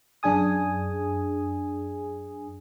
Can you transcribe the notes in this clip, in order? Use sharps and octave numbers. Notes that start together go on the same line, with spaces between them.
F#2 D4 G#4 G#5 D#6